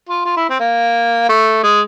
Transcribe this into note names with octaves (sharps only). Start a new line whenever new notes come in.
F4
F4
E4
C4
A#3
A3
G#3